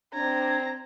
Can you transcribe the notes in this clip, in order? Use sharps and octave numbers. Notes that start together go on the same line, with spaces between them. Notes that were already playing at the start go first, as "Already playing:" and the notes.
C4 D4 A#5 G#6